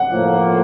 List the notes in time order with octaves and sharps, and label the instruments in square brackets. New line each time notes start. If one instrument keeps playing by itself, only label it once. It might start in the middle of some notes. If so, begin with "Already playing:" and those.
Already playing: [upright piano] F#5
[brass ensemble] A2 F3 A#3